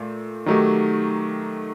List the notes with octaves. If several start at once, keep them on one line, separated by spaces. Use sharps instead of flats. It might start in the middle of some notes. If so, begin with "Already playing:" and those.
Already playing: A#2 A3
D#3 F#3 A3 D#4 G4